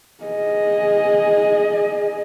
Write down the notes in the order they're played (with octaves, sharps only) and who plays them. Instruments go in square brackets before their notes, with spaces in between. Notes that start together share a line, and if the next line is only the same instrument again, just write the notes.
[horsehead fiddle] G#4 D#5